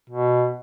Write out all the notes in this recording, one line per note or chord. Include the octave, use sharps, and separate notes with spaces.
B2